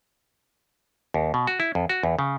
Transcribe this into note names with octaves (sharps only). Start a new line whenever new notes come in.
D#2
B2
F#4
E4
F2
F#4
E2
C#3